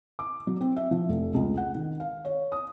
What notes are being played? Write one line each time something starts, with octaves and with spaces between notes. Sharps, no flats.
D6
F#3
C4
E5
F3
F1
C#2
F#5
D#3
F5
C#5
D#6